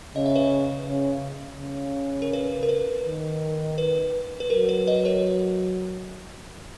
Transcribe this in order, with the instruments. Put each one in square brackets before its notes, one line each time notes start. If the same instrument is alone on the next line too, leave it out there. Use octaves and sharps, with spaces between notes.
[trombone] C#3 [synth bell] D#5
[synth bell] E5
B4 D#5
[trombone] C#3
C#3
[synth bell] A#4
B4
A#4
B4
[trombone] D#3
[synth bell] B4
B4
[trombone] F#3 [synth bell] A#4
[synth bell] B4
B4 D#5
A#4 C#5